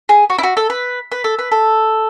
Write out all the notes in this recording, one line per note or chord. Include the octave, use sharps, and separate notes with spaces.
G#4
F#4
E4
F#4
A4
B4
B4
A4
B4
A4